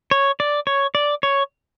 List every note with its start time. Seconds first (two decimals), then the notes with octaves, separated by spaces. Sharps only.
0.11 C#5
0.40 D5
0.67 C#5
0.95 D5
1.23 C#5